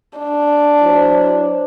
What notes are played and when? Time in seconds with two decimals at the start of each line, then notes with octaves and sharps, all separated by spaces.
0.18 D4
0.82 F#3 E4 C5